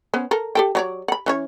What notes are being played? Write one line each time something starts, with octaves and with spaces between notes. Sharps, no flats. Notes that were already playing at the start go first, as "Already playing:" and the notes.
B3 C#4 C5
A4 A#4
G4 A4 G5
F#3 C#5 D5
F#5 B5
E3 C#4 C#5